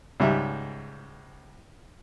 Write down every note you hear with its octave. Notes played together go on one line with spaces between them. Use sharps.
C#2 G#2 G3 E5